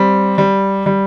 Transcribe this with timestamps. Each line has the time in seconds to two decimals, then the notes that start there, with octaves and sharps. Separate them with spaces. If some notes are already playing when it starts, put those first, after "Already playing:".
Already playing: G3 C4
0.38 G3
0.86 G3